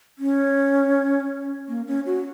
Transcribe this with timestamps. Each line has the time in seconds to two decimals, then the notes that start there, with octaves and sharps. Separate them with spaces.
0.19 C#4
1.68 A#3
1.87 C#4
2.06 F#4